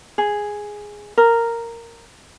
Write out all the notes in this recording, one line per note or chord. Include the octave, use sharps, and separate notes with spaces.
G#4
A#4